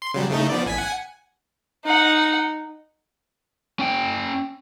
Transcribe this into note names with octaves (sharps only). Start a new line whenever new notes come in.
C6
C#3 F#3 G3
C#3 A3 D#4
F3 B3 D5
A1 G#5 B6
F#5 G#5
D#4 F#5
C#4 G5